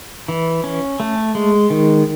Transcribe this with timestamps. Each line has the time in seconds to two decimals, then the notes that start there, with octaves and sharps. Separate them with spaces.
0.28 E3
0.64 C#4
1.00 A3
1.35 G#3
1.70 D#3